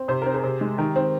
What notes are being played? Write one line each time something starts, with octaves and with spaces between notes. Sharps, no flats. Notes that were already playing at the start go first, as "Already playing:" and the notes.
Already playing: C4
C3 C5
C4 A#4
G#4 C5
C3
G#3
D#3 G4 A#4
C4